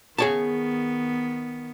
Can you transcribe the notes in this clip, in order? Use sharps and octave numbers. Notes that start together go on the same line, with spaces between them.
D#3 B3 G#4 C#5 A5